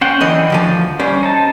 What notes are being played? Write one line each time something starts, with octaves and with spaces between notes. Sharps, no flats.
C#4 C5 F#5 G5
D3 E3 D#5
D2 F3 G#5
G3 C#4 C5 D5
D#4 A5